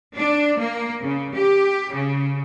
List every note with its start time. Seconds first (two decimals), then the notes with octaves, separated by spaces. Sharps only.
0.15 D4
0.59 A#3
1.01 C#3
1.35 G4
1.93 C#3